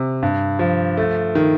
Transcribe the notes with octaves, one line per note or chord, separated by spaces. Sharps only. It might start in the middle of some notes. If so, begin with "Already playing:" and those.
Already playing: C3
G2
F3
A3
D#3